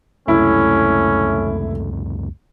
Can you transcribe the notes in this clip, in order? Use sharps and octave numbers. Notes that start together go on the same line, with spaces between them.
C#2 F#2 C3 A3 C#4 E4